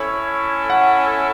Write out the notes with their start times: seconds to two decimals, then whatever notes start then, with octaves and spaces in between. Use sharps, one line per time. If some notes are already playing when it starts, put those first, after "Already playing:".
Already playing: C#4 E4 A4 C#5
0.70 F#5